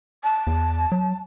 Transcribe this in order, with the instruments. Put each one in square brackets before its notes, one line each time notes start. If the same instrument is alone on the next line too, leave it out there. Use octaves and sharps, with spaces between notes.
[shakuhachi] A5
[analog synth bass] E2
F#3